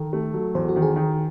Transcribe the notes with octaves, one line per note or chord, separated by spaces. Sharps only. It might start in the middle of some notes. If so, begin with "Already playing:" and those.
Already playing: D#3 A4
A3
F#3
E2 C5
F#4
D#3
G#4
D#3